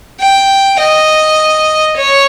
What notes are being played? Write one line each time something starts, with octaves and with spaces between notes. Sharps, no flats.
G5
D#5
C#5